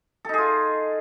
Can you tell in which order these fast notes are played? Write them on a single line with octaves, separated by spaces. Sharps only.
A4 D#4 G#4 F4